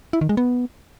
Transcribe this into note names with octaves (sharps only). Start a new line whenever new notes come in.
E4
D#3
G#3
B3